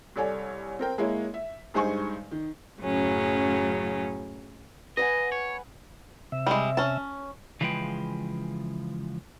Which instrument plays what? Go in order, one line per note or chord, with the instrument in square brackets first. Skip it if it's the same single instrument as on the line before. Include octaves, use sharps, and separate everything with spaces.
[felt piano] C2 A4 C#5 D5 G#5
C4 A#4 G5
G#3 A#3 E4 C#5
E5
G2 G#3 D#4 C5 G#5 C#6
D#3
[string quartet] F#2 A2 C#3 F#3 C#4
[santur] B4 F#5 G#5 [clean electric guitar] D#5
[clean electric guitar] C#5
[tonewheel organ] C3 E5
[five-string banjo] G3 G#3
C#4 A5
[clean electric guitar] C#3 E3 F3 G#3 B4 G5